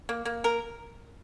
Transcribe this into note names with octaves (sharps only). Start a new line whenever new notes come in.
A#3
A#3
A#4